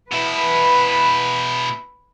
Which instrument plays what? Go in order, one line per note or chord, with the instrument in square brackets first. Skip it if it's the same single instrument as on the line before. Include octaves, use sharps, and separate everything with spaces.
[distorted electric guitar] B2 E4 [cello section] B4